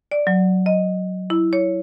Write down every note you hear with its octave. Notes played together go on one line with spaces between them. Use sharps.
D5
F#3
D#5
E4
C#5